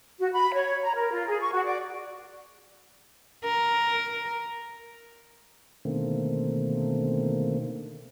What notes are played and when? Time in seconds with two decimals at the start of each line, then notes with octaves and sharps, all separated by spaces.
0.20 F#4
0.32 B5
0.54 C#5
0.83 A#5
0.95 A#4
1.12 F4
1.28 G#4
1.41 C#6
1.52 F#4
1.64 D5
3.44 A#4
5.85 B2 D3 D#3 A3 A#3 C4